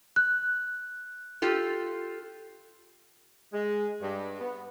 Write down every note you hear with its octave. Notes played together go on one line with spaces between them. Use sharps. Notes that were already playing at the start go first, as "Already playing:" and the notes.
F#6
F4 G4 A4
G#3
G2
B3